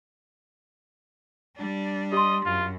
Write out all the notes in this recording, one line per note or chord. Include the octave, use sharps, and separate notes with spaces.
G3 D4
G4 D#5 C6
F#2 F4